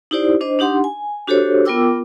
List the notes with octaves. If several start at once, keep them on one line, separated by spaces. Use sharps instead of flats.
D#4 E4 G4 C5 D5
D4 C5 D#5
D4 D#4 G4 F#5 C6
G#5
D4 F#4 G4 A4 C5 C#5
B3 F4 A#4 G5 D6 E6